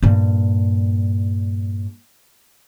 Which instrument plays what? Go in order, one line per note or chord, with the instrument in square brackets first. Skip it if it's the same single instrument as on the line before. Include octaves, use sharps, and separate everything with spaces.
[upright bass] G2 A#2